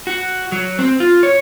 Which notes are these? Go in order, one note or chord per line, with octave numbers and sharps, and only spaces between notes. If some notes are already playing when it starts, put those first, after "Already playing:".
F#4
F#3
C4
F4
C#5